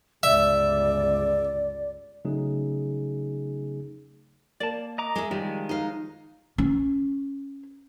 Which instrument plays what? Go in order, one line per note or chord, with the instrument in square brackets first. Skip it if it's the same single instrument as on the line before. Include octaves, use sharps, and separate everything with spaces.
[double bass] G1 C#2 [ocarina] D5 [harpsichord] E5
[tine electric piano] C#3 F#3 A3 D#4 G#4
[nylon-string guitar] A#3 [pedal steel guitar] D5 A5
[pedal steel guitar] D#5 A#5 D6
[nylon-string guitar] G#3 E5
[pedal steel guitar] D#3 F3 G#3 [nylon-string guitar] G3
[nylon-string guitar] D#4 F5
[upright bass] C#4